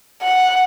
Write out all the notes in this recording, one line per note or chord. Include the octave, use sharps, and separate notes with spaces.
F#5